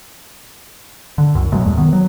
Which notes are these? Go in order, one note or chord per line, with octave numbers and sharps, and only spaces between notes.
D3
C2 F#2
B2 F#3 G#3 A3
A1 E2 G2
D#3 B3
F#3